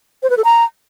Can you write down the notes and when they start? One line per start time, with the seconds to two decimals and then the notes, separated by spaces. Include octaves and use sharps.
0.23 C5
0.30 B4
0.37 A4
0.44 A#5